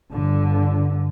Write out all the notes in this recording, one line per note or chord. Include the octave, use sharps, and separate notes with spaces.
G1 D3